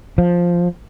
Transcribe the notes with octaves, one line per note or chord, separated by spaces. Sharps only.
F3